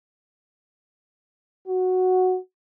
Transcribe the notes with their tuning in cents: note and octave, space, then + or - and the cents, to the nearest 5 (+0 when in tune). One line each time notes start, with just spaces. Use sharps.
F#4 -5